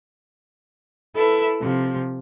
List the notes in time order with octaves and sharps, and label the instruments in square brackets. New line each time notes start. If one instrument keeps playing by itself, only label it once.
[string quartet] E4 A4 B4 E5
C3 F3